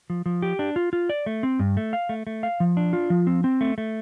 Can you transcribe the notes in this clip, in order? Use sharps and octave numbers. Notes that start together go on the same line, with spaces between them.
F3
F3
G4
D4
F4
F4
D5
A3
C4
G2
A3
F5
A3
A3
F5
F3
D4
F4
F3
C4
C4
A3
A3